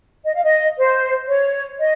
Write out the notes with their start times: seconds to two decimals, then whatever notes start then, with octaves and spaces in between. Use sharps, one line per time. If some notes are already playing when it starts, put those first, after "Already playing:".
0.25 D#5
0.35 F5
0.44 D#5
0.77 C5
1.28 C#5
1.80 D#5